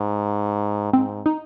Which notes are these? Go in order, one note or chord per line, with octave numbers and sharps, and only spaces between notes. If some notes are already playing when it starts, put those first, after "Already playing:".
Already playing: G#2
G#2 C4
D#4